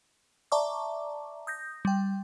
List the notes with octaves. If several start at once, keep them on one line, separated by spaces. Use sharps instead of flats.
D5 E5 A5 A#5 C#6 D6
D#6 G6 A#6
G3 G5